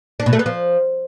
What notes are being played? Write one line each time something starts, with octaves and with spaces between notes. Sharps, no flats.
D4
B2
A3
B3
F3